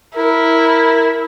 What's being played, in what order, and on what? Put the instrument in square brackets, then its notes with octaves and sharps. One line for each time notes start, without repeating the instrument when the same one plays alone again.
[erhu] E4 [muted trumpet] A#4